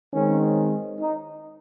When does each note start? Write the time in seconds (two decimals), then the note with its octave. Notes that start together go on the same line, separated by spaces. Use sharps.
0.13 D#3 G#3 C4 C#4
1.01 D#4